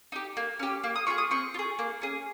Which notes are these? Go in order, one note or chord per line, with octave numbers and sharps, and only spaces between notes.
D#4 G4
A#3
C#4 G4
A#3
D#6
F4 G#4 C#6
D#6
C4 C#6
F4
G#4
A#3
C#4 G#4